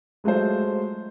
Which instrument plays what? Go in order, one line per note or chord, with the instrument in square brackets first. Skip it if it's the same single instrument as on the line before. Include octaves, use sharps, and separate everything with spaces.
[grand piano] F#3 G#3 A3 F4 C5